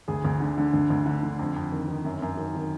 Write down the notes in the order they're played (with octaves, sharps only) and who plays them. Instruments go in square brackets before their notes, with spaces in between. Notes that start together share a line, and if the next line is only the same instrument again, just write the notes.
[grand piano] D2 G#4
D2
D3
D3
D2
D2
D3
D3
F2
F2
D#3
D#3
F#2
F#2
D#3
D#3